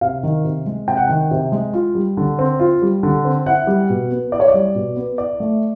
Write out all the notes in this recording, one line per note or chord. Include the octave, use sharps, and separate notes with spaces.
C3 F5
D#3
C3
G#3
C3 G5
F#5
D#3 G5
C3
G#3
F4
G3
D3
C4
F4
G3
D3
C4
E4 F#5
G3
B2
B3
E4 D5
C#5
D5
G3
B2
B3
E4 D5
A3